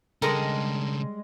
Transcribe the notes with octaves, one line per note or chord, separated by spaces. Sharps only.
C#3 G3 G#3 D4 A4 A#4 A#5